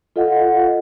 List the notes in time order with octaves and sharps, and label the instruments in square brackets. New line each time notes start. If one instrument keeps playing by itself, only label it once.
[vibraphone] F4 A4 D#5 F5 F#5